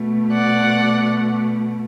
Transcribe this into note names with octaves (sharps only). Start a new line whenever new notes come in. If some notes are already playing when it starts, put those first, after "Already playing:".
Already playing: B2 A3
D5 F#5